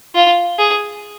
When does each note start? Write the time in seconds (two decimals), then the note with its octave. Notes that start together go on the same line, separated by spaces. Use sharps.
0.15 F4
0.59 G#4